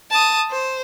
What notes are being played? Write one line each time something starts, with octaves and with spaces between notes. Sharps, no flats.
A5 D#6
C5